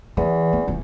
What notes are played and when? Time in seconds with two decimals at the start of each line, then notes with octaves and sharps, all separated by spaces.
0.17 E2 E3
0.53 B3
0.68 D#1 C#4